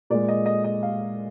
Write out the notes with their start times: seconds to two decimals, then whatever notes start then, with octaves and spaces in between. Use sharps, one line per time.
0.10 A#2 G#3 D5
0.28 D#5
0.46 D#5
0.64 D#5
0.83 F5